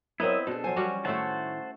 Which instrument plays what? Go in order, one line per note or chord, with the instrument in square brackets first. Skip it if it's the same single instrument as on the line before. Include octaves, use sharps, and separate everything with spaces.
[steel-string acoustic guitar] F#3 A#4 A#5 [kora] B3 C4 [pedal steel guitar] E4 D#5 E5
[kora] B2 [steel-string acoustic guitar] D4 G#4 [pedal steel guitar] A4
[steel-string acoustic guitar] F3 F#3 G#5 [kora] C5
[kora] G3 C#4 F#4
[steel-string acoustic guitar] A2 D#3 [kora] A3 E4 C#5 [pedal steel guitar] C5 F#5 A5